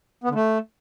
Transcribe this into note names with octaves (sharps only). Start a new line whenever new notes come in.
B3
D3
A3